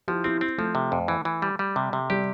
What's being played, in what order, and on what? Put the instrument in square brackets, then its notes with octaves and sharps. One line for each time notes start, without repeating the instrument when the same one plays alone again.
[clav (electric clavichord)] F3 [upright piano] E4 G4
[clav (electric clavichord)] C4 [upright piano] E4 G4
[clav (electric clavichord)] C4
[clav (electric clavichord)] F3 [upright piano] A3
[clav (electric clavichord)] C3
F2
E3
E3
G3
G3
C3
C3
[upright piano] G3 [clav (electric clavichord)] G4